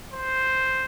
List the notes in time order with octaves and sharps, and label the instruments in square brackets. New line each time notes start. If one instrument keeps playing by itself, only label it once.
[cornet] C5